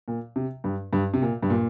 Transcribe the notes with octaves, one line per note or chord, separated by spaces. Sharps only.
A#2
C3
G2
G2
C3
A#2
G2
A#2